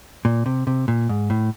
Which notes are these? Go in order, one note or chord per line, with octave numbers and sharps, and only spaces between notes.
A#2
C3
C3
A#2
G#2
A2